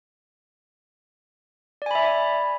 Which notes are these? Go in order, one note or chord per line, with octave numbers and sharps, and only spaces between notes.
D5 E5 G#5 B5